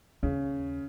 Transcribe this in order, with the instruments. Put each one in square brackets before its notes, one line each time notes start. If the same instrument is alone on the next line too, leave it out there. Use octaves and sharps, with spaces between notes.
[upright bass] D#2 [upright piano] C#3